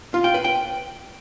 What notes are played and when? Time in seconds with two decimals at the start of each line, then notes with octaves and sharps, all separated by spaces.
0.14 F4
0.24 G5
0.34 B4
0.44 G5